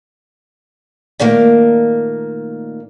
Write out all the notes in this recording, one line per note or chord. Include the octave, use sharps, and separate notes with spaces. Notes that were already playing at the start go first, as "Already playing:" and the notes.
A#2 D#3 A3 A#3